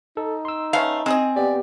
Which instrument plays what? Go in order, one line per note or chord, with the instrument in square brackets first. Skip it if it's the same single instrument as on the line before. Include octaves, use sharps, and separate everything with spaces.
[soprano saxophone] D#4 [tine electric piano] A4
[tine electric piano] C6 E6
[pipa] A3 B3 C#4 [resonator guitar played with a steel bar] F5
[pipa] G#3 G#4 D#5 [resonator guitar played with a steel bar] C4
[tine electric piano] B3 G4 [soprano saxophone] D5